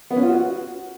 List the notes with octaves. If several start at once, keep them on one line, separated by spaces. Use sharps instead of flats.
B3
C#4
F4
F#4